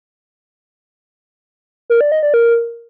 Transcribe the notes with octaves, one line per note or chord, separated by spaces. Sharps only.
A#4
D5
D#5
D5
A#4